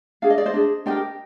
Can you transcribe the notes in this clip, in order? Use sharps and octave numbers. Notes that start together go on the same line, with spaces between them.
D4 G#4 F5
D#5
D5
C5 D#5
D4 G#4
D4 G4 A#4 D#5 G5